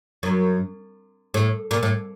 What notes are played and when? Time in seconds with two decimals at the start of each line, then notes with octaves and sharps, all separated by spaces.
0.23 F#2
1.34 A2
1.71 A#2
1.83 A2